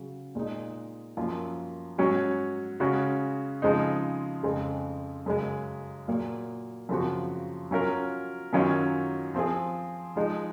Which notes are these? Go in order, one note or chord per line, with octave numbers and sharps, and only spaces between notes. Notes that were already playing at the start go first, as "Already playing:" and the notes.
Already playing: C#3 F#3
A#2 G#3 D#4
F#2 F3 A#3 F4
G#2 F#3 C#4 F#4
C#3 G#3 C#4 F#4
C#3 F3 G#3 C4 D#4
F2 C#3 G#3 C4
F#2 C#3 G#3
A#2 F#3 A#3
F#2 C#3 F3 C4 F#4
F#3 C#4 F4 A#4
F#2 D#3 F#3 C#4 F4
F3 C4 F4 G#4
F3 G#3 D#4